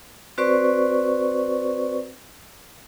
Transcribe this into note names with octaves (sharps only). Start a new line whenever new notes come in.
C4 F#4 B4 C5 D5 C#6